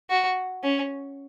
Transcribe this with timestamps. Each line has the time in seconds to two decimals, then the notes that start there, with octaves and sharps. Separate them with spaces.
0.10 F#4
0.63 C#4